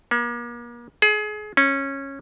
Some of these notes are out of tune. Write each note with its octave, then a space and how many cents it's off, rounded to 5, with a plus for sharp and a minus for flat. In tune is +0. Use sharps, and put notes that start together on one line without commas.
A#3 +40
G#4 +30
C#4 -15